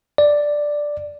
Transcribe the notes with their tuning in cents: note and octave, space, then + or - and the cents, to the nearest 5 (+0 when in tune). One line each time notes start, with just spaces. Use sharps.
D5 +0